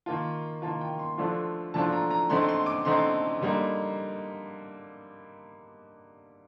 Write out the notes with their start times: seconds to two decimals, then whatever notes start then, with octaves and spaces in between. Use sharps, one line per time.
0.06 D#3 A#3 F4 A5
0.62 D#3 A#3 F4 A5
0.81 G5
0.99 C6
1.18 D3 F3 A3 D4 F4
1.74 D3 F3 A3 D4 F4 A5
1.92 A#5
2.11 A#5
2.30 D3 A3 C4 D#4 C6
2.49 C6
2.66 D6
2.85 D3 A3 C4 D#4 C6
3.41 D3 G3 A#3 D#4